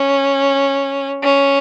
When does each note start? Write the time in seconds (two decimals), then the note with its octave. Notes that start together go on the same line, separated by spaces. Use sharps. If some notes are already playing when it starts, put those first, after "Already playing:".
Already playing: C#4
1.23 C#4